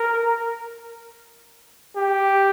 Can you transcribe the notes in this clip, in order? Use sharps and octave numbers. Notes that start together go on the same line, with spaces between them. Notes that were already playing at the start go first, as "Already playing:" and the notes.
Already playing: A#4
G4